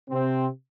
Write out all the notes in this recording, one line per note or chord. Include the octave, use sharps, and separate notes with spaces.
C3 C4